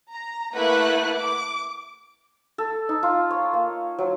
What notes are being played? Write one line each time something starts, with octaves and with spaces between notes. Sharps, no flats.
A#5
A3 A#3 E4 B4 F#5 F#6
D6
A4
D#4
F4
C#5
A#3
F#3